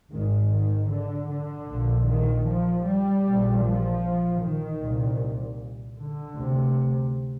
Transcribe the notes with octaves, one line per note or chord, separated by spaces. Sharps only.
G#1 G#2 D#3
D#3
D3
D3
A#1 A#2
D#3
F3
G3
A#1 A#2
F3
D#3
C2 A#2
D3
D2 C3